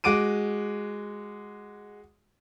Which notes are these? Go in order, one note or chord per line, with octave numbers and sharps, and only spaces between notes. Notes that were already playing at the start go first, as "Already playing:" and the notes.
G#3 F#4 D6 D7 D#7